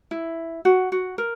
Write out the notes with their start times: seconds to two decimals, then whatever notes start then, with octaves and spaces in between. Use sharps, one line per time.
0.11 E4
0.65 F#4
0.92 F#4
1.18 A#4